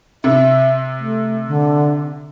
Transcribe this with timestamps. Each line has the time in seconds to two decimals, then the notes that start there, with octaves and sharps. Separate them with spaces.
0.24 C3 E5
0.99 A3
1.47 D3